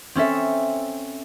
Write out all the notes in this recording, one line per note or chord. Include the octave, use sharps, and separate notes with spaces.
C4 C#4 A4 E5